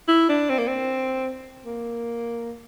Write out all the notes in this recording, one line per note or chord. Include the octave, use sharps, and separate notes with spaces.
E4
D4
C4
A#3
C4
A#3